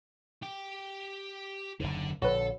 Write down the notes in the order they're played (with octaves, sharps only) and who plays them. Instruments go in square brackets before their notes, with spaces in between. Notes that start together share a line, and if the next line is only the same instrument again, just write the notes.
[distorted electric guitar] G4 G5
[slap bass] F#1 D#2 [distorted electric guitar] D3 D4
[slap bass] A#1 D3 [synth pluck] F#4 B4 [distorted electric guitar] A4 [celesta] C#5